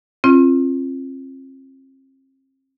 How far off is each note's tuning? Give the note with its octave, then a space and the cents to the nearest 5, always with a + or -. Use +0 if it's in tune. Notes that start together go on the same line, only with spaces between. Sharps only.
C4 +40 F4 -20